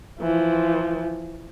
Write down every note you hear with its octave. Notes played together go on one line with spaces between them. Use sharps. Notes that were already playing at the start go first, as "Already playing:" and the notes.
E3 F3